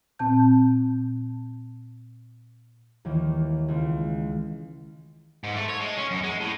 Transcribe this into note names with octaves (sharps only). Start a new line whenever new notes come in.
A#2 C4 A5 G6
D#2 D#3 E3
C#2
G#2
A3
C#5
G#3
C#4
F#2
G#3
A2